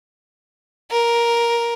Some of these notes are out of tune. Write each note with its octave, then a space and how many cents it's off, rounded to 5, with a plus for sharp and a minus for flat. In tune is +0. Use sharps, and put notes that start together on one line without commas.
A#4 +10